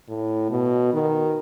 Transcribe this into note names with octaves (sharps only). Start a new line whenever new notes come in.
A2
B2
D#3